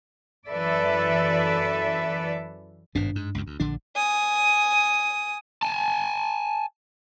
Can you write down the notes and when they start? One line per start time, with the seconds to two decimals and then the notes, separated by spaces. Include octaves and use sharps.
0.49 F#2 E3 A4 B4 D5 E5
2.95 G#1 G2 B2 D4
3.16 G#2
3.35 C#2 F#2
3.47 D2
3.60 A#1 D3 D4
3.96 G#5 D#6
5.63 G#5 A5